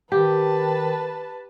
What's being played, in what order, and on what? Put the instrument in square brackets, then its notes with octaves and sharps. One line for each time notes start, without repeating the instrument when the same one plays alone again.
[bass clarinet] D#3 [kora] G4 [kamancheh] B4 A5